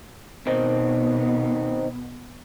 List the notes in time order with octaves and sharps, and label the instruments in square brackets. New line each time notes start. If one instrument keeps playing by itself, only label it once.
[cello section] B2 B3 [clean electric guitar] D#3 C4 D#4